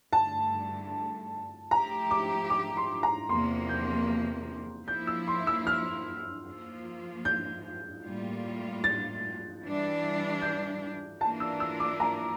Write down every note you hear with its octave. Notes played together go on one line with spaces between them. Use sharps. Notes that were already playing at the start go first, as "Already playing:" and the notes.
G2 D3 A3 A5
F3 A3 E4 G4 A#5
D6
D6
C6
A#5
E2 C3 F3 A#3 C6
G6
F3 A#3 E4 G6
E6
C6
E6
F6
F3 A#3 F4
G6
A2 G3 A#3 F4
A6
E3 G3 D4
G6
E3 A#3 D4 F4 A#4 A5
E6
E6
D6
A#5